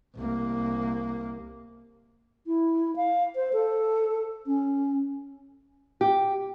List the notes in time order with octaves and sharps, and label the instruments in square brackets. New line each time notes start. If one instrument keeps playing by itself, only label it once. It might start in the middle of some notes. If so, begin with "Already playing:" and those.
[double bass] C2 A#3
[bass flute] E4
F5
C5
A4
C#4
[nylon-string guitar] G4